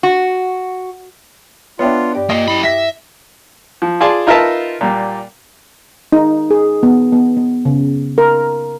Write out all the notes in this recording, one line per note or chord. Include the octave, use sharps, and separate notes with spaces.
F#4
B3 D4 F4 C#5 E5 G5
G2 G4 D5
A#2 A#3 D#5
F#2 E4 B5
E5 A#6 B6
F3
F4 G#4 D5 G#5 A5 C6
D#4 F4 A#4 B4 E5 A5
A#2 G3 A#3
D#4
G#4
B3
B3
B3
C#3
A#4